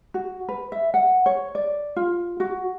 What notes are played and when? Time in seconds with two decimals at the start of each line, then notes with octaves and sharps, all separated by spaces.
0.14 F#4
0.49 B4
0.72 E5
0.94 F#5
1.26 C#5
1.55 D5
1.96 F4
2.40 F#4